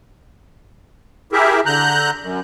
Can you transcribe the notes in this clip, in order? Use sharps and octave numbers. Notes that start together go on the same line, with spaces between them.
E4 G4 G#4 A#4 E5
D3 A#5 F#6 G6
F#2